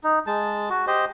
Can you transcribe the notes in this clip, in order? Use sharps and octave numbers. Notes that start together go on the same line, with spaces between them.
D#4
G#3 A5
F#4
G4 C5 D#5